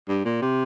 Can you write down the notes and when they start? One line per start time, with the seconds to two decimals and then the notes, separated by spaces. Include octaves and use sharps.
0.08 G2
0.25 A#2
0.41 C3